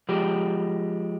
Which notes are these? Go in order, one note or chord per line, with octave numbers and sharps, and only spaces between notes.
F3 G#3 G4